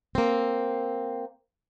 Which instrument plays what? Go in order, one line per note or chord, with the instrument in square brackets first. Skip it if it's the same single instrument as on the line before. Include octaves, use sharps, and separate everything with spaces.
[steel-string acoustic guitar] A#3 C4